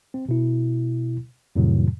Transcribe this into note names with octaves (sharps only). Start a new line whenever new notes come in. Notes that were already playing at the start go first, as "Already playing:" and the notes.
C4
B2 E4
F2 A2 C3 D#3 F#3